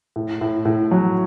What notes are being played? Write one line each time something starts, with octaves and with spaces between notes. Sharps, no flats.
A2
A2
A2
F#3